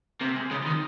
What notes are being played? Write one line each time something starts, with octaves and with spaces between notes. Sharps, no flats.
C3 A#3
G#3
C#3 G#3
F4
D#3 D#4